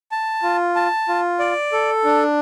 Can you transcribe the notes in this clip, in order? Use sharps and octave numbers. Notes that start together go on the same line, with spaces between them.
A5
F4
A5
F4
D5
A4
D4